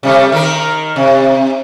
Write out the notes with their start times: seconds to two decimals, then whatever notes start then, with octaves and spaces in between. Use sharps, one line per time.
0.03 C3 G3 A3
0.32 D#3 A#4
0.96 C3